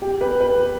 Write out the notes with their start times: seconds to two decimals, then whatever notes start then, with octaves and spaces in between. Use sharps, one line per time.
0.02 G4
0.21 B4
0.40 B4